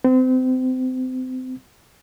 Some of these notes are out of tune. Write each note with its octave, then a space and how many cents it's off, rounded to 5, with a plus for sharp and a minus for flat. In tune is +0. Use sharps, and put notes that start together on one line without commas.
C4 -30